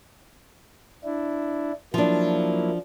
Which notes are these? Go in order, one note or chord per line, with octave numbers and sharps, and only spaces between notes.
D4 E4
F3 F#3 A#3 D4 E4